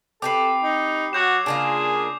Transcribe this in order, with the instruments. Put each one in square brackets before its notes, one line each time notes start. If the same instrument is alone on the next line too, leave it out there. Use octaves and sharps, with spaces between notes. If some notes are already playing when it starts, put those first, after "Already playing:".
[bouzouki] C4 G4 B4 [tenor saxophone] A4 [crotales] D6 C7
[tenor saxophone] D#4
[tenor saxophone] F#3 [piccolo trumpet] F#4 [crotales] D6 G6 E7
[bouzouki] C#3 A#3 F4 [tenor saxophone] D4 [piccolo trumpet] G#4